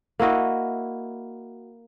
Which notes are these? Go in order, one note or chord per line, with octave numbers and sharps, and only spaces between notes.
A#3 E4 F#4 D#5